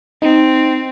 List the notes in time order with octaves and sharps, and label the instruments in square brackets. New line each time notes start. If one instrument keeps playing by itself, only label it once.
[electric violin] C4 [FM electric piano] D#4